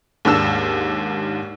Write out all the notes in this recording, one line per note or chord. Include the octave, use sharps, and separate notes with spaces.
D#2 G#2 D4 E6 E7